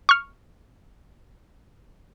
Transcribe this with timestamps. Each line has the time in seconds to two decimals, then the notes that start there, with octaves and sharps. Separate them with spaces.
0.09 C#6 F6